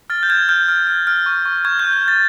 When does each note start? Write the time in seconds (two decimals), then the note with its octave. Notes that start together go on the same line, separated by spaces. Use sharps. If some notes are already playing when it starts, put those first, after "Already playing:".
0.10 F6 A6
0.23 G6
0.29 F6 G#6
0.49 F6 G6
0.68 F6
0.87 F6
1.07 F6
1.26 C#6
1.45 C#6
1.65 C#6 G#6
1.79 G6
1.85 F6
1.93 G#6
2.03 F6 A6